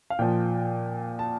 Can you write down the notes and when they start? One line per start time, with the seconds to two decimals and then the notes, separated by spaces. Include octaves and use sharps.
0.10 F5
0.19 A#2 F3 G5
1.19 A5